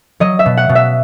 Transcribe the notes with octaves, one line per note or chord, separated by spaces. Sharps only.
F#3 D#5
E5
B2
F#5
B2
E5